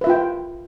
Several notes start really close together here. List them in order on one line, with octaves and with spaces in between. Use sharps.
B4 E5 F4 G5